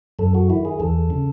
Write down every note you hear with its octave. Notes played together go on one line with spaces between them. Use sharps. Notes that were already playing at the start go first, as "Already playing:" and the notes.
F#2 A4
F#4
D#3 E4
G#4
E2 A4
C#3